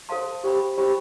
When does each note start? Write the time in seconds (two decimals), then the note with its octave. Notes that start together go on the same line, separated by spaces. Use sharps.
0.09 A4 C5 F5 A5 C6
0.44 G4 C5 G5 B5
0.78 G4 C5 G5 B5